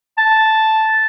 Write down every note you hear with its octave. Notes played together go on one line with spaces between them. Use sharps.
A5